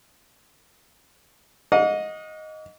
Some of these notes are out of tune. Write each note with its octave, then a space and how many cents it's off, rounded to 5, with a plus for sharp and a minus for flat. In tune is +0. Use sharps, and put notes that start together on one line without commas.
D#5 +0 F#5 -45 D6 -45